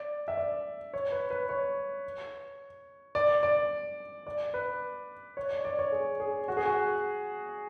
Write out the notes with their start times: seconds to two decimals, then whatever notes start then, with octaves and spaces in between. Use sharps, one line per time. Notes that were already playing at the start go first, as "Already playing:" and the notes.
Already playing: D5
0.28 E5
0.37 D5
0.94 C#5
1.12 B4
1.30 B4
1.49 C#5
3.15 D5
3.43 D5
4.27 D5
4.54 B4
5.37 C#5
5.50 D5
5.64 D5
5.79 C#5
5.92 G#4
6.20 G#4
6.48 F#4
6.57 G#4
6.66 F#4